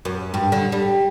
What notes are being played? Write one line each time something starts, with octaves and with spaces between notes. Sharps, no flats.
F#2
G2
D3
G3